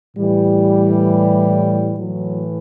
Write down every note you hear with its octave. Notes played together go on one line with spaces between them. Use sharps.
A2 E3 G3
A2 E3 F#3